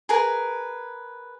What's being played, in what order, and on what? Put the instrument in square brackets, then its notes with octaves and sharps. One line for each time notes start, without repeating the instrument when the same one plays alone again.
[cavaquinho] G#4 A#4 B4